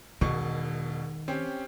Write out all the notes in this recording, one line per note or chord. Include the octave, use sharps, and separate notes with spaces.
E1 B2 D#3 C#6
C4 C#4 G4